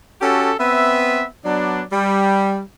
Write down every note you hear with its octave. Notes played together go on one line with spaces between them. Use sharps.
C#4 F#4 G4 A4
B3 C4 B4 E5
F#3 B3 D4
G3